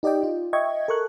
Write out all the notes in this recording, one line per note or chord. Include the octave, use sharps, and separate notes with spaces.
D#4 G4 D5 D#5 G5
F4
D#5 E5 G5 C#6 G#6
A4 A#4 C#6 F#6